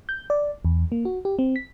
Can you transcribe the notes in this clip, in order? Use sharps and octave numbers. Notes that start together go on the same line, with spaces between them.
G6
D5
E2
A#3
F#4
G4
C4
B6